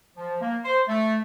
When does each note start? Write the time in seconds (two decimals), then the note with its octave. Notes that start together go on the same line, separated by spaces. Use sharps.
0.16 F3
0.41 A#3
0.64 C5
0.88 A3